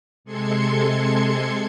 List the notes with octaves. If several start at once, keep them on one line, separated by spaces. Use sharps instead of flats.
C3 G#3 A4 C6 G#6 C#7